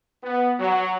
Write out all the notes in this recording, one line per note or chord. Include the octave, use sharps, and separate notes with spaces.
B3
F#3